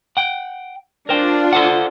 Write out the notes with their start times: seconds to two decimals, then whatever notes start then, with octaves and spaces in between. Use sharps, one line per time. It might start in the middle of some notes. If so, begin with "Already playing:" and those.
0.17 F#5 G5
1.09 D4 F4 A#4 C5 G5
1.53 A4 C5 F#5